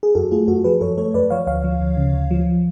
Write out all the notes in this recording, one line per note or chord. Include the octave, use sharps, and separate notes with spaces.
G#4
F#2 F#4 A4
A3 F4 G#4
F#2 F#4 A4
F3 G#4 B4
F#2 A4 C#5
A3 A4 C#5
F#2 B4 D5
F3 C#5 F5
D2 C#5 F5
F3
D2
C#3
D2
F3